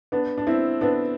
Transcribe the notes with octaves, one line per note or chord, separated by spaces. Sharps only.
B3 D4
D4
C4 E4
B3 D4